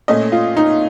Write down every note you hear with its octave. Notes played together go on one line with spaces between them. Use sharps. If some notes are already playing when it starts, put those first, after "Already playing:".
A#2 A3 C#4 D#5
F4
D#4